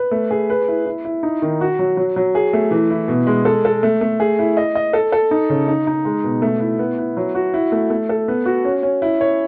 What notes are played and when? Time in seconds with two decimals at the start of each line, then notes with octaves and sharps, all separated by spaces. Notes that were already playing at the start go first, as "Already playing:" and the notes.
Already playing: B4
0.11 A3
0.31 G#4
0.50 B4
0.68 E4
0.86 E4
1.05 E4
1.23 D#4
1.42 D#3
1.61 F#4
1.79 F#3
1.97 F#3
2.16 F#3
2.35 G#4
2.53 A3
2.71 E3
2.91 E4
3.08 B2
3.27 G#3
3.45 A4
3.65 A4
3.83 A3
4.01 A3
4.20 G#4
4.39 E4
4.57 D#5
4.75 D#5
4.93 A4
5.12 A4
5.31 D#4
5.50 C#3
5.68 D#4
5.87 D#4
6.05 G#3
6.24 B2
6.42 A3
6.60 E4
6.79 B3
6.98 E4
7.17 F#3
7.35 F#4
7.54 E4
7.72 A3
7.90 A3
8.09 A4
8.28 B3
8.46 F#4
8.65 C#4
8.83 C#4
9.02 E4
9.21 C#5